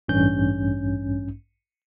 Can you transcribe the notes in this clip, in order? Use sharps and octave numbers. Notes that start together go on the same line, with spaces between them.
A1 G2 C#4 G6